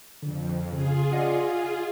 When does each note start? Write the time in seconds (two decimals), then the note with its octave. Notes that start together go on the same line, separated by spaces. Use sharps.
0.23 F2 D3
0.72 C#3 F4 G#4
1.12 D5 D#5 F#5